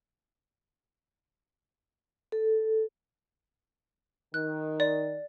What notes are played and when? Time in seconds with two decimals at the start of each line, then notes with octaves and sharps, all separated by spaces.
2.32 A4
4.34 D#3 F#6
4.80 D5